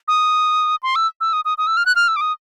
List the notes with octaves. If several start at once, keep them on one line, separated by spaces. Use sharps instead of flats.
D#6
C6
E6
E6
D#6
D#6
D#6
E6
F6
F#6
F6
E6
D6
D#6